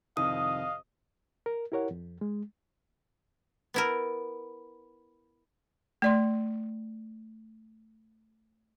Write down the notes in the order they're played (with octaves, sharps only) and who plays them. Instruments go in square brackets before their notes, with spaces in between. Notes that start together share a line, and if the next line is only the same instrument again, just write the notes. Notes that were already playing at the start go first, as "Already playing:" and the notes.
[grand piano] C2 F2 D#3 [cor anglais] D#5 [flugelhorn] F5 [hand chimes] D#6
[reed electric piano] A#4
E4 G4 A#4 C#5 F#5
F2
G#3
[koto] B3 E4 A#4
[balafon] A3 D5 C6